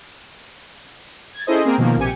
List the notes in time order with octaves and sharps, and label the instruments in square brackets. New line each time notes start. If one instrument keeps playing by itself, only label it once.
[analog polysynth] G#6 A6
C#4 E4 G#4 A4 C5 D#5
A#3 C4 G#4 A#4
B2 D#3 F3 A#3
A#1 C3 G4 G#5 C#7